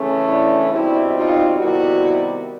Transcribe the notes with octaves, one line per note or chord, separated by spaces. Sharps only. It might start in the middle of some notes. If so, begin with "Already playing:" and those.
Already playing: C#3 E3 A3 C#4
D4 E4
B2 G3 C4 D4 E4
D#4 F4
C3 D#3 G3 B3 E4 F#4